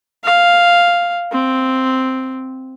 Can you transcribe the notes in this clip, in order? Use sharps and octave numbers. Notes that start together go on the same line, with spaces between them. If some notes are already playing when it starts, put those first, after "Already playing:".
F5
C4